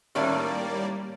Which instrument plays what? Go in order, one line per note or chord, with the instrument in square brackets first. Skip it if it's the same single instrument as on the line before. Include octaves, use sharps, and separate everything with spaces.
[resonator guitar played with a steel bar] A2 D#3 C#4 [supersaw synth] G3 A#3 D5